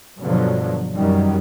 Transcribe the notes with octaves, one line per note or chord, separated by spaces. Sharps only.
G2 B2 D3 F3 F#3
F#2 D#3 F#3 G3